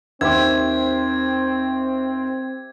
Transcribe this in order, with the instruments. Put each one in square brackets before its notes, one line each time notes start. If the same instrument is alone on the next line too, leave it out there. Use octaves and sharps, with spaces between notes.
[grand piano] D#2 [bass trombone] C4 [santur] G4 C5 E5 [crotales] G#6